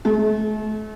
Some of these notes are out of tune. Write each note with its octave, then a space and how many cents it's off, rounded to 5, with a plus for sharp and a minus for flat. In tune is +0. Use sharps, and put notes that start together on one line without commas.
A3 -40